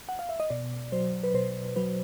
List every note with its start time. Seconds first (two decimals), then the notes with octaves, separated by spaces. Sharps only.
0.09 F#5
0.19 F5
0.29 E5
0.40 D#5
0.50 B2 D5
0.92 F#3 C5
1.23 B4
1.34 B2 C5
1.76 F#3 B4